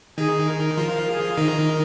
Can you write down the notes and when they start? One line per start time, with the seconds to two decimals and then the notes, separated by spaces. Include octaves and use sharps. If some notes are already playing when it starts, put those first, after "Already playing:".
0.18 D#3 D#4 G#4
0.47 A#4
0.77 F3 F4
1.08 G#4
1.37 D#3 D#4 A#4